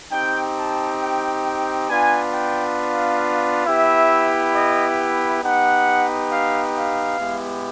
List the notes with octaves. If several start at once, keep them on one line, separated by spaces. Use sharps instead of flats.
C4 D#4 G4 G5
A5
G5
G5
B3 D4 F4 G#5
G5
F5
B3 E4 G4 E5
D#5
E5
B3 D#4 G4 F#5
F5
F5
G#3 B3 E4 G4